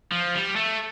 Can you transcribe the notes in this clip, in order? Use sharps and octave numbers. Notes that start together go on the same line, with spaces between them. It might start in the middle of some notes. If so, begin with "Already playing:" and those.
F3
G3
A3